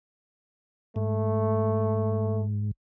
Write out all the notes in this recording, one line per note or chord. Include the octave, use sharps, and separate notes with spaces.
G#2 A3